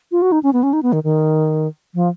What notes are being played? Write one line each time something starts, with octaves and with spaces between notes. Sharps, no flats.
F4
F#4
D#4
C#4
B3
C#4
D#4
B3
D#3
D#3
F3